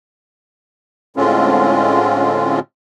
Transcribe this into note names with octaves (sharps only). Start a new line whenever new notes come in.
A2 D3 G#3 C4 C#4 F4